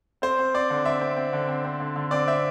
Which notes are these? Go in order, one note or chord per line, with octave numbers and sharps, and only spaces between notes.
C4 C5
C4
C4 D5
D3
C4 E5
C4
C4
D3
C4
C4
D3
D3
C4 D5
C4 E5